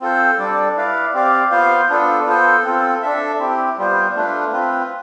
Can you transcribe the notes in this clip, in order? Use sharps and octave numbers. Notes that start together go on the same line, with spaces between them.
C4 F4 A4 C5
G3 D4 A4 D5
E4 B4 D5 F5
C4 G4 D5 F5
B3 F4 C5 F5
B3 D4 F4 A4
B3 F4 A4 C5
C4 F4 A4
D4 A4 E5
C4 E4 G4
G3 B3 F4 C5
A3 D4 F4 B4
C4 F4 B4